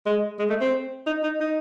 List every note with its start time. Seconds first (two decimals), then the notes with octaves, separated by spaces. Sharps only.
0.06 G#3
0.39 G#3
0.50 A3
0.61 C4
1.06 D#4
1.23 D#4
1.40 D#4